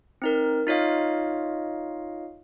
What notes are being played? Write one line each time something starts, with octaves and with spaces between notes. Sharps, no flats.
C4 D#4 A#4
D#4 F4 C#5 D#5 F5